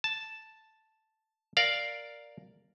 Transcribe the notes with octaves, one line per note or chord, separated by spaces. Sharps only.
A5
A#4 D5 F5